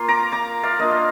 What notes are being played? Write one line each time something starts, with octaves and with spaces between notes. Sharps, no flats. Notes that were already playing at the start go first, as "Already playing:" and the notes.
Already playing: A#3 F4 C6
A#5 D6
A#5 D6
D5 F5
A#3 D4 F4 D#5
F5